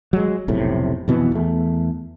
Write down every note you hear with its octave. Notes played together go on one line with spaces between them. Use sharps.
F#3 G#3
F1 B1 A2 C3
F2 B2 E3 B3
E2 A3